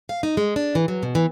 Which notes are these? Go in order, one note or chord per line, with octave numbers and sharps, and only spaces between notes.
F5
D#4
G#3
D4
E3
F#3
B2
E3